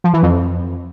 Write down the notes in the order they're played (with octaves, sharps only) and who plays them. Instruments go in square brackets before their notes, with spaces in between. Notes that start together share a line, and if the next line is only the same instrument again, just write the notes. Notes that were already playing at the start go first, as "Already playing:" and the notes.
[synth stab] F3
E3
F2